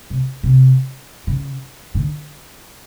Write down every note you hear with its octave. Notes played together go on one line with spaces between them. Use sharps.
C3
C3
C#3
D3